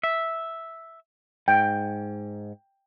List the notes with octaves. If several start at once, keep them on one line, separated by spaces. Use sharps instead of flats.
E5
G#2 G5